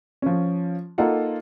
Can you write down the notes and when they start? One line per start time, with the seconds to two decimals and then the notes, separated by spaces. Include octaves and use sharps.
0.22 F3 C#4
0.98 A#3 D#4 F4 A4 F#5